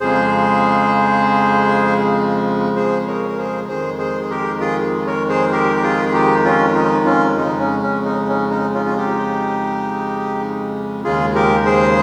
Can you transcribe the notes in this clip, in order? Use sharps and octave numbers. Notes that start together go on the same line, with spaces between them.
F2 C#3 F3 G#3 G#4 C5
G#4 C5
A#4 C#5
A#4
G#4 C5
F2 D#3 G#3 G#4 C5
G#4 C5
G#4
G4 A#4
F4 G#4
A#4 C#5
G#4 C5
G4 A#4
G4
F4 G#4
G#4
D#4 G4
C#4 F4
D#4
C#4 F4
F2 C#3 G#3 D#4
C#4
C#4
D#4
C#4
D#4
C#4 F4
F4
D#4 G4
D#2 C#3 G#3 F4 G#4
G4 A#4
G#4 C5